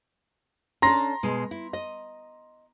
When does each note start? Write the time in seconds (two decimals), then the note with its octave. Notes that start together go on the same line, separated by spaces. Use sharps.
0.82 C#4 D4 A4 A#5 C6 A#6
1.23 B2 G#3
1.51 E4
1.73 D#5